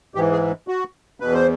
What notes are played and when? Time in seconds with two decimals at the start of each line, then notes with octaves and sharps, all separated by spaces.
0.15 G#2 E3 G4
0.32 G#4
0.68 F#4
1.20 E2 B2 B4
1.34 C5